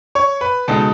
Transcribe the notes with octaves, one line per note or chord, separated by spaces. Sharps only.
C#5 C#6
B4 B5
C#2 B2 G#3 D#4 A4 A5